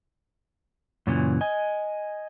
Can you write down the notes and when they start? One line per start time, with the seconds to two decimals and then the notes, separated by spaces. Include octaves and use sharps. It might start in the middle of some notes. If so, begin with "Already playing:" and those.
1.07 F#2 A#2 C#3 E3
1.41 D#5 G#5